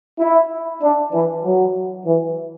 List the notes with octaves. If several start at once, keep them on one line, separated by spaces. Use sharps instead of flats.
E4
D4
E3
F#3
E3